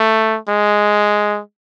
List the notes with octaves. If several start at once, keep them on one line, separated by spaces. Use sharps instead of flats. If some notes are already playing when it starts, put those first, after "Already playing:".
Already playing: A3
G#3